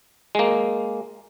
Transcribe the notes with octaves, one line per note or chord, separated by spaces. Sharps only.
G#3 A#3